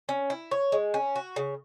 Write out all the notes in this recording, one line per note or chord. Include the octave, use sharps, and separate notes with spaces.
C#4
E4
C#5
G#3
C#4
F#4
C#3